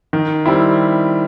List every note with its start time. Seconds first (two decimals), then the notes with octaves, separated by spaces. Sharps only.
0.13 D#3
0.46 G3 C4 E4